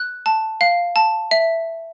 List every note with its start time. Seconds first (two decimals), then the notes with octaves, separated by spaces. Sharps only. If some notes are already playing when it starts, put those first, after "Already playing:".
Already playing: F#6
0.26 A5
0.61 F5
0.96 A5
1.31 E5